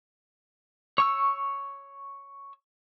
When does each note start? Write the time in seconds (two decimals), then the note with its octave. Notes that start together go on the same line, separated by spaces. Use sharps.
0.98 C#5 C#6 E6